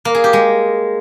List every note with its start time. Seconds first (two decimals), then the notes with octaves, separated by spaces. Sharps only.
0.05 A#3
0.15 G#4
0.24 G4
0.33 G#3